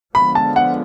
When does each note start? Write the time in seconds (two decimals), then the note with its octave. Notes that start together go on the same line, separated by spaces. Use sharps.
0.14 D3 F3 G#3 B3 B5
0.35 A5
0.56 F#5